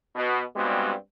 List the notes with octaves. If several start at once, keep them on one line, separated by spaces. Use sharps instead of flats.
B2
G2 G3 G#3 B3 C4 F#4